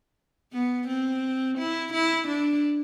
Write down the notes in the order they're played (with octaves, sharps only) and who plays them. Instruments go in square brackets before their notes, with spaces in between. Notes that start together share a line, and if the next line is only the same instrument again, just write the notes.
[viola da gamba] B3
C4
E4
E4
D4